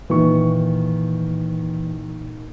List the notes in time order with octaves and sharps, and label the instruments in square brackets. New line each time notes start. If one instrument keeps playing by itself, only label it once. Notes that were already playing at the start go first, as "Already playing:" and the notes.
[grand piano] A#2 D#3 C#6 [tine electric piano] E3